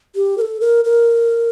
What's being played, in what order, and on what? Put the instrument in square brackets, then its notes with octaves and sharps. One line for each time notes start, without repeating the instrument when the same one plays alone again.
[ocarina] G4
A#4
A4
A#4
A#4